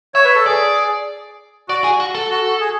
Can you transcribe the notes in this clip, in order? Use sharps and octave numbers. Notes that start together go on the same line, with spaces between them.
C#5 E5
B4
A4
G#4 D5
F#4 D5
G#4
F#4
A4
F#4
G#4